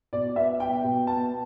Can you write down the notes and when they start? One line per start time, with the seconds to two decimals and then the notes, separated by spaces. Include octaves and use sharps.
0.13 B2 D5
0.36 B3 E5
0.60 B3 G5
0.84 B2
1.07 B3 A5